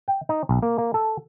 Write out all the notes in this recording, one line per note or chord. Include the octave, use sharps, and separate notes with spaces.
G5
D#4
B1
A#3
A#3
A4